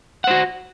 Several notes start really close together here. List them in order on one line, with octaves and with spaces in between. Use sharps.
F#5 C5 F#4